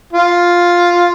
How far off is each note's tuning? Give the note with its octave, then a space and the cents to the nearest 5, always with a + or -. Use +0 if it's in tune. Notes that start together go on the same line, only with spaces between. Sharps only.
F4 +5